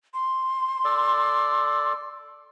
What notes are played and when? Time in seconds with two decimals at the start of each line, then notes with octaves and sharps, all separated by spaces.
0.14 C6
0.85 A4 D5